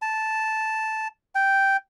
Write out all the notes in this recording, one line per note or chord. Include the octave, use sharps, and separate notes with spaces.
A5
G5